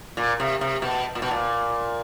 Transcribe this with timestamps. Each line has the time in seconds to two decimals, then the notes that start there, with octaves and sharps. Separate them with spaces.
0.17 A#2
0.40 C3
0.61 C3
0.82 B2
1.15 A#2
1.22 B2
1.31 A#2